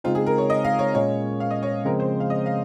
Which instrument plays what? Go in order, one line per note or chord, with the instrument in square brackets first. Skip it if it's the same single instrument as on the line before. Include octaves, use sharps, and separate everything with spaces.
[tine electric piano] C#3 G#3 C4 D#4 [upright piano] F4
[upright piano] G#4
A#4
C#5
D#5
F5
C#5
[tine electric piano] A#2 G#3 C#4 [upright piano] C#5
[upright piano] F5
D#5
C#5
[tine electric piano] C#3 F3 G#3 C4 [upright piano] A#4
[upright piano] C5
F5
D#5
F5